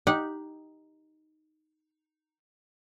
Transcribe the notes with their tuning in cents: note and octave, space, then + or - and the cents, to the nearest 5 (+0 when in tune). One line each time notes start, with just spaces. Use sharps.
D#4 +0 G4 +0 F#5 -20